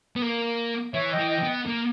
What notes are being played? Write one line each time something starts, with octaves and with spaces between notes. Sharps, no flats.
B3
A#3
E3 C#5 E5
D#5 G5
E3
D#5 G5
B3
A#3